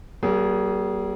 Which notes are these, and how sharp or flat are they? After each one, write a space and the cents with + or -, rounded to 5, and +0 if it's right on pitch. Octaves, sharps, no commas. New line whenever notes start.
G3 -45 A#3 +20 G#4 +0